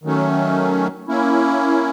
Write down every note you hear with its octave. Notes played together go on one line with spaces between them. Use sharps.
D#3 F#3 A3 C#4
A#3 C#4 E4